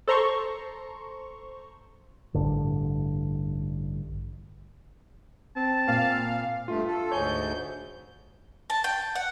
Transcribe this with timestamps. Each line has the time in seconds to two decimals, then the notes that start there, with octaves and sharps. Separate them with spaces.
0.08 A4 C5 A#5 C6 C#6
2.34 A1 G2 D3
5.56 C4 A5
5.88 A#2 F5
6.68 G2 A3 F4
6.87 A4
7.11 D2 G#2 C#5 G#5 G6
8.70 A5
8.84 G5
9.15 F#5